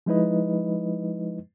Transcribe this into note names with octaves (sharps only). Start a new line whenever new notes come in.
F3 G#3 D#4 E4 B4 D#5